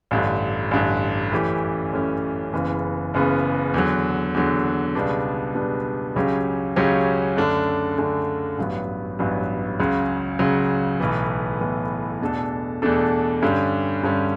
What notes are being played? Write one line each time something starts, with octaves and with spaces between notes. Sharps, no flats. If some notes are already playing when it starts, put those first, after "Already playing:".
A1 G2 D3
A1 G2 D3
F#2 E3 A3 C#4 G4
F#2 E3 A3 C#4 G4
F#1 F#2 C#3 E3 B3
F#1 F#2 C#3 E3 B3
E2 D3 F#3
E2 D3 F#3
C#2 B2 G3 B3 D4
C#2 B2 G3 B3 D4
C#2 C#3 F#3 C#4 G4
C#2 C#3 F#3 C#4 G4
F#2 D3 A3 D4
F#2 D3 A3 D4
A1 G2 F#3 B3
A1 G2 F#3 B3
C#2 C#3 F#3
C#2 C#3 F#3
B1 A2 E3 B3
B1 A2 E3 B3
E2 B2 A3 D4 A4
E2 B2 A3 D4 A4
G2 D3 G3 C#4
G2 D3 G3 C#4